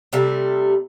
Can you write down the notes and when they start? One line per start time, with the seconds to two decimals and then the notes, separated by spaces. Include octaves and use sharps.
0.13 C3 G3 A3